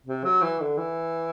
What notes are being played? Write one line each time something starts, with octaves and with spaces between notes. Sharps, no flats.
C3
F#3
E3
D3
E3